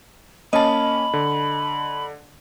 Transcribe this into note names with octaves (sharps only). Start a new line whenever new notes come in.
A#3 C#4 D#5 A5 B5
D3